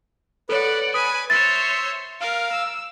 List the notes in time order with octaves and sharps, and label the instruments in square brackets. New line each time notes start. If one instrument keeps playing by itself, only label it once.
[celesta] A4 C#5 [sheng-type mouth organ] B4 [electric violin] D5 F#5
[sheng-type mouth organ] B4 B5 [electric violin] G#5 [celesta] D#6
[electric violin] C5 C#5 [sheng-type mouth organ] E5 C6 [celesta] A6
[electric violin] A#4 [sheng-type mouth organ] F5
[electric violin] E6